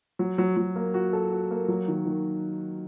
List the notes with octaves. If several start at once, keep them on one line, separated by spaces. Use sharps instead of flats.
F#3
F#3
F#3
A#3
F#4
A4
F#4
A#3
F#3
D#3
D#3